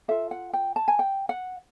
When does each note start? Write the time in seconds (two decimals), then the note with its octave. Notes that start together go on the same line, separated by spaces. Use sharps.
0.08 F4 A4 E5
0.31 F#5
0.53 G5
0.76 A5
0.88 G#5
0.99 G5
1.29 F#5